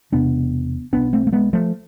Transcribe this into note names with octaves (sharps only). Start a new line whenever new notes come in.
E1 E2 C3 B3 D4
B1 B2 B3 D4
A3 C4
A3
G#3 B3
F3 A3